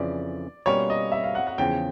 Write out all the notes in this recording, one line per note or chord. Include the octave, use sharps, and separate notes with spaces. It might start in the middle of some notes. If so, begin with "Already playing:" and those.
Already playing: F2 C#3 E3 D5
B2 G3 A#3 C#4 F4 C#5
D#5
E5
F5
F#5
F#5
E2 C#3 F3 G5